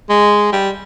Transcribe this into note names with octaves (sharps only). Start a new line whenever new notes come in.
G#3
G3